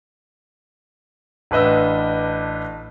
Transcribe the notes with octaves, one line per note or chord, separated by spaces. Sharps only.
A1 D4 B4 D#5 E6